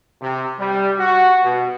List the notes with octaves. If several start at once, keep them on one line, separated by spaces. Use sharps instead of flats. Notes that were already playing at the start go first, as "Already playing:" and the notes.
C3
G3
F#4
B2